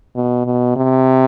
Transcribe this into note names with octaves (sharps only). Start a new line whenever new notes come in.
B2
B2
C3